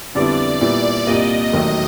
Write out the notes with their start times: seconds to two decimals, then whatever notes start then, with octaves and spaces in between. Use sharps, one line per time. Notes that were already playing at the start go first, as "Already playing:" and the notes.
0.15 F2 D3 G3 B3 E4 D5
0.61 A#2 G3 B3 E4 D5
1.07 C2 A#2 G3 A#3 D#5
1.53 E1 D#2 D#3 F#3 A3